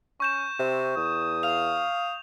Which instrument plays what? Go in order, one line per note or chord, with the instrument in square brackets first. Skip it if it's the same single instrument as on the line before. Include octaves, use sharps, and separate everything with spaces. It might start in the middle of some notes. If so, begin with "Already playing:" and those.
[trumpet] C#4 [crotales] C#6 G6 E7
[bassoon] C3 [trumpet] C4
[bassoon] E2 [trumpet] D#6
[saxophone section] F5 [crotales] F7